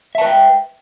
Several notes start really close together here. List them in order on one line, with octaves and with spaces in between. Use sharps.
E5 A5 B4 G5